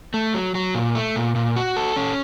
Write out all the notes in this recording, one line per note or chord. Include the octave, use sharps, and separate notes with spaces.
A3
F#3
F#3
A#2
A3
A#2
A#2
F#4
A4
C#4